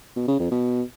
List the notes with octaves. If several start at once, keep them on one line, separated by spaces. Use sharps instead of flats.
B2
C#3
F2
B2